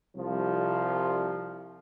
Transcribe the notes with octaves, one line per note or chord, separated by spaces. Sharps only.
C2 F3